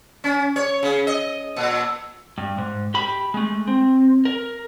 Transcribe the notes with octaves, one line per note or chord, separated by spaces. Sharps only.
C#4
C#5
C#3
D#5
A#2
G2
G#2
G4 B5
G#3 A3
C4
A#4